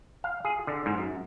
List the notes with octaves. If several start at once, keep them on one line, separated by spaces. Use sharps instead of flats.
F5
G#4
D3
G#2
F#2